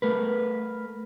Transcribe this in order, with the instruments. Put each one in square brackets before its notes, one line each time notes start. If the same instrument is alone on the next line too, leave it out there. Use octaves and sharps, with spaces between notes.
[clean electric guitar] A3 A#4 B4